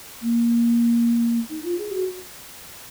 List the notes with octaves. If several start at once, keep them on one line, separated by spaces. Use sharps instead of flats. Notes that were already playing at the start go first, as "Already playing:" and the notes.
A#3
D#4
F4
G#4
F#4